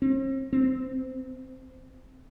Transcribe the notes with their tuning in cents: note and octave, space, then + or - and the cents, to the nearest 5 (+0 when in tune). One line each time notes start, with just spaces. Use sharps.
C4 +45
C4 -20